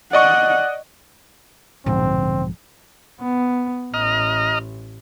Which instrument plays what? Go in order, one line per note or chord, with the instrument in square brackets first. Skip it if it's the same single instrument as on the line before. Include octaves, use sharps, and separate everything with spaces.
[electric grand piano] D5 D#5 C#6 [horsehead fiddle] F#5
[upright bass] D#1 D3 [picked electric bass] B1 G#2 F3 [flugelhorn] C4
[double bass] B3
[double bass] A1 [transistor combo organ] D#5 A#5 F6